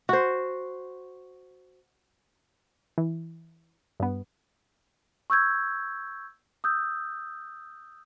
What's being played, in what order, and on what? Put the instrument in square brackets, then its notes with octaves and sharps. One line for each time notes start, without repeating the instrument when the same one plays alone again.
[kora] F#4 C5
[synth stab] E3
G2 B3
[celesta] C#6 E6 G6 G#6
D#6 E6 G6